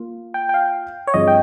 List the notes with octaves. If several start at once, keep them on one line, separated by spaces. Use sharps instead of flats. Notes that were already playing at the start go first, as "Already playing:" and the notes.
Already playing: A#3 F4
G5
G5
F5
C#5
G2 F3 C4 F4 G#4 D#5
G5